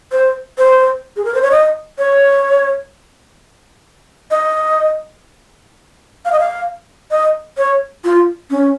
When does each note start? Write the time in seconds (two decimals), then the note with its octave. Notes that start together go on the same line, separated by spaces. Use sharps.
0.12 C5
0.58 C5
1.17 G#4
1.25 A#4
1.34 C5
1.42 C#5
1.51 D#5
1.98 C#5
4.31 D#5
6.25 F5
6.32 D#5
6.40 F5
7.11 D#5
7.58 C#5
8.04 F4
8.50 C#4